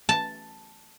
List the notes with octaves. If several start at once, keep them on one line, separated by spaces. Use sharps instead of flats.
A5